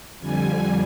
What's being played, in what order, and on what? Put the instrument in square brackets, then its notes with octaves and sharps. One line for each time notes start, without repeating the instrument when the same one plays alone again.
[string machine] F2 D3 G3 G#5